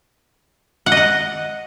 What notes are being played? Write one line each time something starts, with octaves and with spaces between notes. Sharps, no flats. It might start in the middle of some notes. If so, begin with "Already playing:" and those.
F#5
D#5
F#5